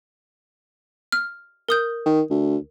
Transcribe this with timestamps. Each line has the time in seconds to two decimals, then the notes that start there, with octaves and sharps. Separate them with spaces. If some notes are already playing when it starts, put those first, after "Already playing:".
1.12 F6
1.69 A#4 D#6 G6
2.06 D#3
2.30 D2